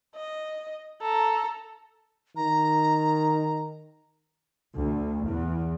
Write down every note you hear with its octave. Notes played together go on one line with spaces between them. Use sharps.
D#5
A4 A#5
D#3 A#5
D2
E2